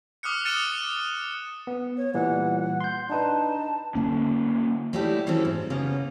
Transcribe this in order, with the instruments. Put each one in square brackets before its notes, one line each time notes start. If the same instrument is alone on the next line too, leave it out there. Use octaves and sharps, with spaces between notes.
[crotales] D6 D#6 F6 F#6 C#7
F6 A6 C#7 D#7 E7 G7
[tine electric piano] B3
[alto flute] C#5
[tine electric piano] A#2 E3 G3 [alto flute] F#5
[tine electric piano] C6 G6
[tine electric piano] D4 D#4 B4 [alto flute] A5
[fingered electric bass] D3 A#3 C#4
[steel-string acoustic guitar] F#3 G3 A3 D#4 E4 G4
E3 F#3 C4 C#4 E4 A4
G#2
C#3 A#3 B3 C#4 D#4